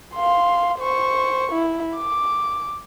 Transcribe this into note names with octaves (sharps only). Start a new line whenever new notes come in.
F5 C6
C5 C#6
E4
D6